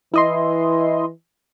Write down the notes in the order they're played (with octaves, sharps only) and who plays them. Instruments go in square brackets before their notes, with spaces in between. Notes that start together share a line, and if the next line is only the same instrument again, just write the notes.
[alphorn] E3 [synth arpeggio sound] E4 D#5 C6